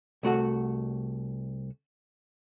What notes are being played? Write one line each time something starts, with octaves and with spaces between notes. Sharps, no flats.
C2 A3 F#4 F#5